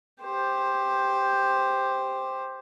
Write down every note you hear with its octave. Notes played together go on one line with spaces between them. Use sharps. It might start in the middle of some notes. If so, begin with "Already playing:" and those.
G4 C5